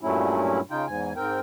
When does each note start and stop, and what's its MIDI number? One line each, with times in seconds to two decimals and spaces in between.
0.01 0.60 43
0.01 0.60 46
0.01 0.60 54
0.01 0.60 57
0.01 0.60 61
0.01 0.60 64
0.71 0.86 49
0.71 0.86 63
0.71 0.86 65
0.71 0.86 79
0.87 1.13 40
0.87 1.13 44
0.87 1.13 80
1.16 1.40 44
1.16 1.40 60
1.16 1.40 70
1.16 1.40 79